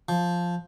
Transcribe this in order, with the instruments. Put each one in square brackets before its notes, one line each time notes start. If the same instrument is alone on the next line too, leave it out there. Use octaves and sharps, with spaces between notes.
[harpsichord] F3